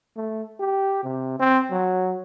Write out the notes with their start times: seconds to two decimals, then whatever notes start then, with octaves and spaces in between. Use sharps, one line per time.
0.16 A3
0.60 G4
1.04 C3
1.39 C4
1.71 F#3